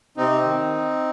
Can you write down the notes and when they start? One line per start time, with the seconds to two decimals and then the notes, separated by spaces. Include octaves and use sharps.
0.17 C3 C4 D#4
0.44 D#3